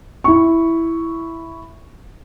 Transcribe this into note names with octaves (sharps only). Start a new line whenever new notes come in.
E4 C#6